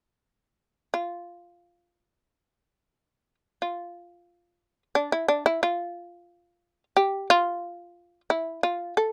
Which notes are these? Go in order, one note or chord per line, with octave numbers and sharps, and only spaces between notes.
F4
F4
D4
E4
D4
E4
F4
G4
F4
E4
F4
A4